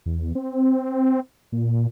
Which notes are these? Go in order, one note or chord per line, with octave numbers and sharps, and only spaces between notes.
E2
C4
A#2